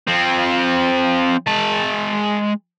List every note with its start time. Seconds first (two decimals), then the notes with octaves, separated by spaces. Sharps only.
0.07 F3 C4
1.47 G#3 A5